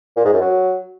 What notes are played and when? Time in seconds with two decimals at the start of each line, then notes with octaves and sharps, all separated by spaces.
0.17 A#2
0.25 G#2
0.33 F#2
0.41 F#3